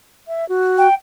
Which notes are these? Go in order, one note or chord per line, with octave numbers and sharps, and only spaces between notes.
E5
F#4
G5